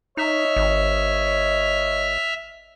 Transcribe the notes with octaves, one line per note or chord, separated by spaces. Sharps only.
D#4 C#5 D#5 E5 F6
G#1